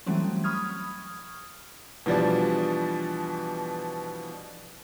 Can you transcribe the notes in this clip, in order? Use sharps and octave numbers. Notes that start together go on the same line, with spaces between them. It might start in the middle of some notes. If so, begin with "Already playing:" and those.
E3 F#3 G3 A3 C4 C#4
B5 C#6 D#6 F6 G#6
B2 E3 F3 G3 D4